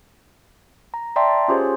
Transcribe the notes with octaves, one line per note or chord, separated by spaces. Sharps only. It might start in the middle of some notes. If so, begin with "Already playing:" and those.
A#5
D5 E5 G5 A5 A#5 C6
C#4 F4 G4 G#4 C5 C#5